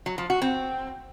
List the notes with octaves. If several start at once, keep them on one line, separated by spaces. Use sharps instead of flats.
F#3
F3
F#4
C4